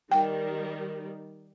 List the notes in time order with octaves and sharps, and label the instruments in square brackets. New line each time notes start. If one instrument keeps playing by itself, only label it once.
[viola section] D#3 G3 [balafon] G5